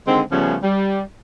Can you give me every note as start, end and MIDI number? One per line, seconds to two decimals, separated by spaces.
0.06 0.21 50
0.06 0.21 51
0.06 0.21 56
0.06 0.21 60
0.31 0.56 49
0.31 0.56 53
0.31 0.56 55
0.31 0.56 57
0.31 0.56 59
0.31 0.56 61
0.63 1.01 55